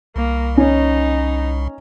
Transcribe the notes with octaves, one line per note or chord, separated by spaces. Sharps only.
C2 A#3
C#4 D#4